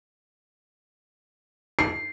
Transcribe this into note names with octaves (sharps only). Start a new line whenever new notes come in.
C7